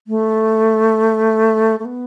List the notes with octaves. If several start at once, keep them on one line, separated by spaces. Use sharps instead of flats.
A3
A3
B3